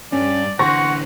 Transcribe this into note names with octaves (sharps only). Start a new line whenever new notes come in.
G2 C#4 D5
D3 E3 C5 F#5 C6 C#6 A#6